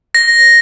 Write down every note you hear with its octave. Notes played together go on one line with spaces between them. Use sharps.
A#6